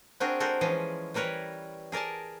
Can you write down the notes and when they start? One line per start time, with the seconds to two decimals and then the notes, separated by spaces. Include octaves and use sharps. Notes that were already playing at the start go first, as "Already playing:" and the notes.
0.20 C4 D4 F#4 G#4 A#4
0.40 G#3 F#4 A4 A#4 C5
0.61 E3 F3 G#3 C#4 G#4
1.14 E3 G3 A#4 B4 C#5
1.92 G#4 A#4 D5 G#5 A5